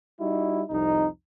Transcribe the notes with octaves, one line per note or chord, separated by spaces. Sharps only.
G3 D#4 E4 F#4
C2 F2 D#4